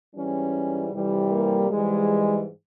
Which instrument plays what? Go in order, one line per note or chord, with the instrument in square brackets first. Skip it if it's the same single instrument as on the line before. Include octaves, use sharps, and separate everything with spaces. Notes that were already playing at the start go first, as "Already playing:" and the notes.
[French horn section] G#2 E3 G3 C#4
F2 C3 E3 G3
A#3
G#2 E3 G3 G#3